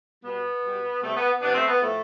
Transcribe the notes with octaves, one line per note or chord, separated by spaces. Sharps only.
B2 G3 B3
B2 G3
C3 G3 A3
B3
C3 F3 B3 D4
A3 C4
B3
A2 F3 A3